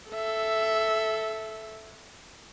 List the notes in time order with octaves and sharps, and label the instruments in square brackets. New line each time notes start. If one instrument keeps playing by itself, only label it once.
[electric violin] A4 E5